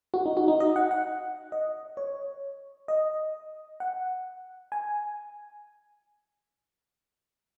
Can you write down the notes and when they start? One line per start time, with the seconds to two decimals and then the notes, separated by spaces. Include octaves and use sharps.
0.14 F#4
0.26 D#4
0.37 F#4
0.48 D#4
0.60 D#5
0.76 F#5
0.91 F#5
1.52 D#5
1.97 C#5
2.88 D#5
3.80 F#5
4.72 G#5